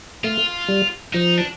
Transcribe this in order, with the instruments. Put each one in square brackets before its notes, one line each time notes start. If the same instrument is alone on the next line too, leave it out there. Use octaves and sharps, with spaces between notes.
[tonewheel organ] A3 [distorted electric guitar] F4
[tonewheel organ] G3
[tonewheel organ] F3 [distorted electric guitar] D#4
[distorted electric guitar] D4